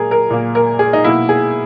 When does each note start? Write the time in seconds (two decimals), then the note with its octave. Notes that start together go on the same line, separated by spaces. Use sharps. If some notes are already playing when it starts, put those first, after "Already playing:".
Already playing: A#2 A#3 G#4 A#4
0.11 A#4
0.30 A#2 A#3
0.55 A#4
0.79 G#4
0.93 D#4
1.04 B2 A#3 E4
1.29 G#4